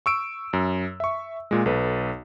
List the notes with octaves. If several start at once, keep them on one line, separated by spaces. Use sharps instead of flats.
C#6 E6 D7
F#2
E5 C#6
A#2 G#3
B1 A4 B4